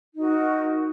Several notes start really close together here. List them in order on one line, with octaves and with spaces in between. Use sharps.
D#4 F#4 A#4